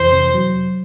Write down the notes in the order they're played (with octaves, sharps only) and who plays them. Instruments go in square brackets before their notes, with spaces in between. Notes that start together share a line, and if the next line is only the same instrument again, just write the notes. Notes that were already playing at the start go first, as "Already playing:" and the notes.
Already playing: [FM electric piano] F2 C3 E3 [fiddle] C5
[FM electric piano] C3
F#3